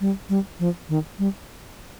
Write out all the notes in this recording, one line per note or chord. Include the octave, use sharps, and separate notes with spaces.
G3
G3
F3
D#3
G3